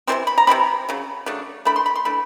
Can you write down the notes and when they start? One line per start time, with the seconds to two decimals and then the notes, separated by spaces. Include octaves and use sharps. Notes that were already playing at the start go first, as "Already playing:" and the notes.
0.07 C3 E3 G3 C4 C6
0.27 B5
0.38 A#5
0.47 C3 E3 G3 C4 B5
0.89 C#3 F#3
1.26 C#3 F#3 A3 D4
1.65 E3 A3 D4 B5
1.76 C6
1.86 B5
1.96 C6
2.05 E3 A3 D4 B5